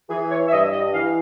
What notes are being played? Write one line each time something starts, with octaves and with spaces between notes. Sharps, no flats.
E3 G#4
C#5
E5
G2 D#5
D#5
E3 F5